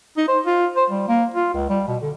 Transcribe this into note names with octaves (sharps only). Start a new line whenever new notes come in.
D#4
C5
F4
C5
G3
A#3
F4
C#2
G3
B2
D3